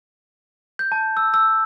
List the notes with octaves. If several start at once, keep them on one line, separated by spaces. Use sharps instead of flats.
G6
A5
E6
E6